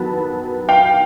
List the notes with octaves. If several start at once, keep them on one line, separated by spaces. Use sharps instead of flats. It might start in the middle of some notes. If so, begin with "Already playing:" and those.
Already playing: D#3 F#3 B3 A5 B5
F5 G5